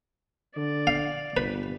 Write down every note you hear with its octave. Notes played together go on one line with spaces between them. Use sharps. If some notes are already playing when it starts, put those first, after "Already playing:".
D3 D5
F5
G1 B4